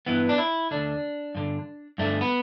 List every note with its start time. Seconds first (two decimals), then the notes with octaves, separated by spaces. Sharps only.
0.06 G2 E3 B3
0.29 D4
0.38 E4
0.71 D2 D3 D4
1.35 G2 D3
1.98 G2 D3 A3
2.21 B3